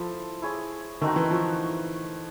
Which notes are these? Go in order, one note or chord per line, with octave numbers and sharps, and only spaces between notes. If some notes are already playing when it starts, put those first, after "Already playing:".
Already playing: F3 E4 A4 C5 E5
E4 G#4 C#5
D#3 A3 C4 D#4 F#4
E3
F3